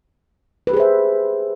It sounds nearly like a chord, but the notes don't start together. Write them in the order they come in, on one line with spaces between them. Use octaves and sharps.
B4 G4 G#4 C5 E5